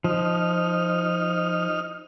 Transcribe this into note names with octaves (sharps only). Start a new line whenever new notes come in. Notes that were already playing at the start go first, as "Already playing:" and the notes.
F3 D#4 F6